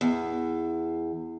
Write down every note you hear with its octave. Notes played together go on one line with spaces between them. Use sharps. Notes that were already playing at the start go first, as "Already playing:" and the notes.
E2